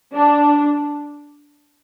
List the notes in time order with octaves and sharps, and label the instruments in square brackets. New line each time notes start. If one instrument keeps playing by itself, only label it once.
[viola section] D4